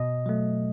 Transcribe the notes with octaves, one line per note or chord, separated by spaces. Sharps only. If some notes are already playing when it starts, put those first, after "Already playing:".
Already playing: B2 D#5
F#3 A3